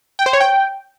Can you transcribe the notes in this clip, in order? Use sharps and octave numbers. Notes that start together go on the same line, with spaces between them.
G5
C5
C#5
G5